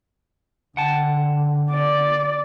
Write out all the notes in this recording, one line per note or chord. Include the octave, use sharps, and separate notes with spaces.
D3 F#5 G5 A5
D5